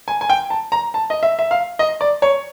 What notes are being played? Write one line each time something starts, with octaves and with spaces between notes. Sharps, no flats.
G#5
G#5
G5
A5
A#5
A5
D#5
E5
E5
F5
D#5
D5
C#5